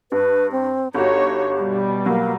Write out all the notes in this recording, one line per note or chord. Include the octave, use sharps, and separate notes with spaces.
G2 B4
C4
G1 D#4 F#4 G4 C#5
B2 G3
F#3 A#3